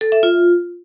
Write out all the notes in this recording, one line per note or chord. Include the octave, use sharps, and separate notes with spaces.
A4
E5
F4